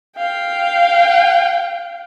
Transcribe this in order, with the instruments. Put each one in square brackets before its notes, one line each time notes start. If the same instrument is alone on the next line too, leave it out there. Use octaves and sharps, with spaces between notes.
[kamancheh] F5 G5